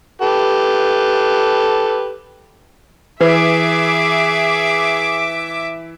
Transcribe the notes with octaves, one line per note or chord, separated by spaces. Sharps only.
G4 A4 B4
E3 G#4 B4 E5 D6